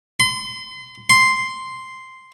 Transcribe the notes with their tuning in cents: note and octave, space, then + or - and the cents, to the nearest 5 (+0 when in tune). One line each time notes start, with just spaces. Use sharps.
C6 -35
C6 -5